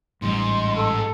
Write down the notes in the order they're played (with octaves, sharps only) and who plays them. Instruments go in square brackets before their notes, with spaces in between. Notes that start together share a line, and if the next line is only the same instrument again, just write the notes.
[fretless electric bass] A1 G3 [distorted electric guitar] G#2 [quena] C6
[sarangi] A4